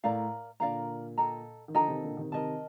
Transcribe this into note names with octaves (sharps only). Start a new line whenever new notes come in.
A2 A#4 D5 F5 A#5
A#2 D3 A#4 D5 F5 A#5
A4 D#5 G5 A#5
D#3
D3 F3 A4 D#5 G5 A#5
C3 D#3
A#2 D3
C3 D#3
C3 D#3 A#4 D#5 A5